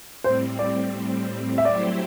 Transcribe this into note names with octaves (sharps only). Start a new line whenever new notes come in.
A2 G3 C4 C5
D5
E5
F#3 A3 E4 G4 C5 D5